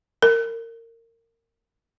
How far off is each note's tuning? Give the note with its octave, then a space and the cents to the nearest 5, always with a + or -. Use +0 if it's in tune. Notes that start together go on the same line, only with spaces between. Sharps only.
A#4 -25